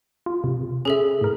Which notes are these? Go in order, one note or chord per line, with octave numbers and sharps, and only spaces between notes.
F4
C3
C#4 G#4 A4 E5
A2 A#4